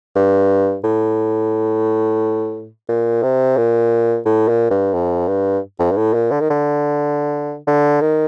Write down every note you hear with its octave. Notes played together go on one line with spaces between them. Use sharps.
G2
A2
A#2
C3
A#2
A2
A#2
G2
F2
G2
F2
G2
A2
A#2
D3
D#3
D3
D3
D#3